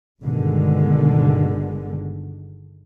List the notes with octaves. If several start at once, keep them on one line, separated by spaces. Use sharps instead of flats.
G1 B2 D3 D#3 G#3